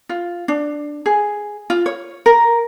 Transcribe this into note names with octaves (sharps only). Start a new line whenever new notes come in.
F4
D4
G#4
F4
C#5
A#4